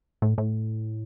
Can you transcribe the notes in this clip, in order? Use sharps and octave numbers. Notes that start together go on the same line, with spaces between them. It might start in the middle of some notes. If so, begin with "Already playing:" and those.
A2
A2